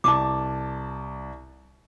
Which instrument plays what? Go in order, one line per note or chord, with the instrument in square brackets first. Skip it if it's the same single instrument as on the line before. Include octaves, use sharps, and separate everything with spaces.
[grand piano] C2 A5 [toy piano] D6